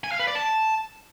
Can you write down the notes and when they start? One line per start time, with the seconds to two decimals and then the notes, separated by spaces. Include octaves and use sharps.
0.04 G#5
0.12 F5
0.19 B4
0.27 D5
0.35 A5